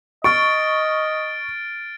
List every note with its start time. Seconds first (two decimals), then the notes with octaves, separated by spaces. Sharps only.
0.24 D#5 C#6 F6 A6 D7